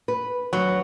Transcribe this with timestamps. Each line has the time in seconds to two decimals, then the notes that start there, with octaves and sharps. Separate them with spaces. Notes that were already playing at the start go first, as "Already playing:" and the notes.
0.08 B4
0.53 D2 F#3 B4